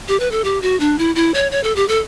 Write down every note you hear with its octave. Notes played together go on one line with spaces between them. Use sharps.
G4
B4
A4
G4
F#4
D4
E4
E4
C#5
C#5
A4
G4
A4